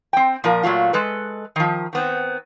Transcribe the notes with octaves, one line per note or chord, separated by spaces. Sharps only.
C4 G5
A#2 F3 A#4
A#2 F#3 A3 F4
G#3 A4 B4
D#3 F3
D#3 B3 C4